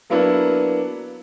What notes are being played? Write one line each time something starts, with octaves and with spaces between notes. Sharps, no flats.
F#3 A#3 B3 D4 E4